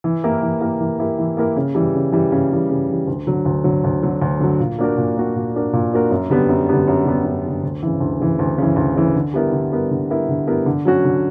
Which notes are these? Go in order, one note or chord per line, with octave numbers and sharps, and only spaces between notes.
E3
A#3 E4 G4 A#4
E3
A#3 E4 G4 A#4
E3
A#3 E4 G4 A#4
E3
A#3 E4 G4 A#4
C#3
E3 G3
C#3
E3 G3
C#3
E3 G3
C#3
E3 G3
D2
D3 F#3
D2
D3 F#3
D2
D3 F#3
D2
D3 F#3
A#2
A#3 D4 F#4 A#4
A#2
A#3 D4 F#4 A#4
A#2
A#3 D4 F#4 A#4
A#2
A#3 D4 F#4 A#4
F#2
D3 G3 B3
F#2
D3 G3 B3
F#2
D3 G3 B3
F#2
D3 G3 B3
D2
C#3 E3
D2
C#3 E3
D2
C#3 E3
D2
C#3 E3
D3
G3 B3 E4 A#4
D3
G3 B3 E4 A#4
D3
G3 B3 E4 A#4
D3
G3 B3 E4 A#4
D3
F#3 C#4 F#4
D3